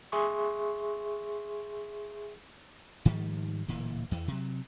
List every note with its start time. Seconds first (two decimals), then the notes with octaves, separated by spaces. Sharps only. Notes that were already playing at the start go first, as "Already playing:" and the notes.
0.12 G#4 E5 C6 C#6
3.05 G#2 D#3 F3 G3
3.68 D1 A#2 E3
4.11 E2 E3
4.28 C3 F#3